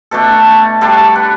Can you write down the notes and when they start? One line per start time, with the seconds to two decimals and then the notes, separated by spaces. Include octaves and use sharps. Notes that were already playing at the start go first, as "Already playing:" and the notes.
0.11 B2 A3 D4 A4
0.81 D3 G3 D4 A4
1.16 B4